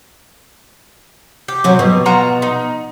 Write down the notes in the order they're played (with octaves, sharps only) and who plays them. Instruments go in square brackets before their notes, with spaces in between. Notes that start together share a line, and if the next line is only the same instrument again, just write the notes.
[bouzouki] G4
[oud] C3 F#3
B2
[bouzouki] F4 F#4 A#5
D#4